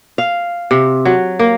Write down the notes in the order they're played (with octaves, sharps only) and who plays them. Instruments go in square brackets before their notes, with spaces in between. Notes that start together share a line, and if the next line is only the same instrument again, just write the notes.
[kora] F5
C3
F#3
A#3